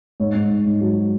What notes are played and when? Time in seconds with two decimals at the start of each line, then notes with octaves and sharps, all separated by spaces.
0.20 G#2 C#5
0.35 G#2
0.50 G#2
0.66 G#2
0.81 F#3